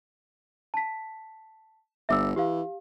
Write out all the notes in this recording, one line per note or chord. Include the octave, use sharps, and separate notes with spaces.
A5 B6
G1 E5 D6 E6
E3 G4 F5